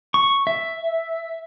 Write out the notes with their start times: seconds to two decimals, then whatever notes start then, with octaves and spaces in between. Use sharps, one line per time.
0.14 C#6
0.47 E5